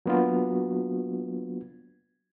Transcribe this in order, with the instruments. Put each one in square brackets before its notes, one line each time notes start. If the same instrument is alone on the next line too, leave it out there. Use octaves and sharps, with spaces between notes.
[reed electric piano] F#3 A#3 B3 D4 F4 F#4